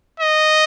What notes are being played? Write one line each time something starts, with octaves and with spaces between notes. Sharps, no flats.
D#5